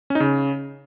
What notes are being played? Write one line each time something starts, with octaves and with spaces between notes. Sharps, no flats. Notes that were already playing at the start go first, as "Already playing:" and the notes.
C#4
D#4
C#3